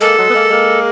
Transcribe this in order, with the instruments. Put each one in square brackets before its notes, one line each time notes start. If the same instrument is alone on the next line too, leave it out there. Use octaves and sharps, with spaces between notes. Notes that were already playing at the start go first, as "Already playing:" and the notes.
[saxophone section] G#3 A#3 [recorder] A4
[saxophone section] F#3 G#3
B3
G#3 A#3
G#3 A#3